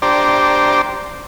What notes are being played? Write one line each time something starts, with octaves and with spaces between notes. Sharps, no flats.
D4 G4 C5 D5 A#5